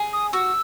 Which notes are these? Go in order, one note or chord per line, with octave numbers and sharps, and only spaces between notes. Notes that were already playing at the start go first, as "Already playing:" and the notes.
Already playing: G#4
D#6
F#4 E6